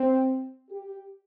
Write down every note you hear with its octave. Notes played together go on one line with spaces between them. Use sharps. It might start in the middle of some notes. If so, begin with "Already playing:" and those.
Already playing: C4
G4